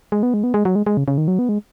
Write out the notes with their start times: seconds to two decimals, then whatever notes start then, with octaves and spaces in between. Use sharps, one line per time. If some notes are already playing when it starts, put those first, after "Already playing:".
0.12 G#3
0.23 B3
0.34 G#3
0.44 B3
0.54 G#3
0.65 F#3
0.75 G#3
0.86 G#3
0.97 C#3
1.08 C#3
1.18 D#3
1.28 F#3
1.39 B3
1.49 G#3